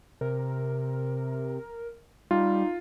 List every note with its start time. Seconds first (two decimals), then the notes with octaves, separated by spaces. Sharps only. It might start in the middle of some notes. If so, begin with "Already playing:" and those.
0.21 C3 A#4
2.31 G3 D#4 F4